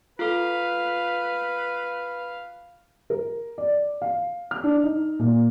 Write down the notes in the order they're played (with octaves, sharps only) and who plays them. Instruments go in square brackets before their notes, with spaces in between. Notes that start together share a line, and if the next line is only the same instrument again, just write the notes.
[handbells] F4 A4 [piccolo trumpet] B4 [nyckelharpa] F5
[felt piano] A#4
D5
F5
F6
D4
D#4
A#2